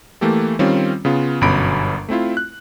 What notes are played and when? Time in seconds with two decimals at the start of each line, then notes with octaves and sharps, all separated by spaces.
0.21 E3 A3 A#3 G4 A4
0.59 D#3 G3 C4 C#4 F4
1.05 C#3 B3 F4
1.41 G1 F#2 B2 F#3 B5 D7
2.09 A3 C4 E4 F4
2.37 F#6